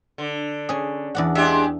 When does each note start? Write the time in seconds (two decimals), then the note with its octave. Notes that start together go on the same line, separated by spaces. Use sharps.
0.18 D3
0.69 C#4 G#4
1.15 E2 D4 F#5
1.35 G#3 D4 G4 E5